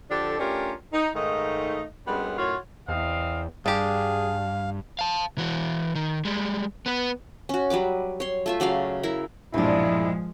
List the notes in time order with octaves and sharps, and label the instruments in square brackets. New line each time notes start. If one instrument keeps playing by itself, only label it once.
[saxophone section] D3 F3 D4 G4 A4
A3 C#4 D4 F4 G4 A#4
D#4
G#2 D#3 A3 D#4 D#5 F5
F#2 G3 G#3 B3 C#4 D4
F#2 A2 F4 F#4 C#5
[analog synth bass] E2 [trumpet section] C4 D#5 F5
[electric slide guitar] G2 [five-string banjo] D4 G4 [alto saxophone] G#4 [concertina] F5
[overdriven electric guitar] F5 A5
E3 F#4
D#3
G3 G#3
B3 B4
[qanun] C#4 F#4
F#3 G3 B4 D6
C#5 C6
A3 F4 E5
C#3 F#3 D5 F5
E4 A#4
[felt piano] B1 G2 A#2 [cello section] F3 G#3 [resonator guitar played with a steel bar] C4 D4 [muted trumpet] E4